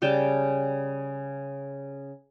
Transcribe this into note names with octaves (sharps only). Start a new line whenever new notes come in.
C#3 G3 G5 A5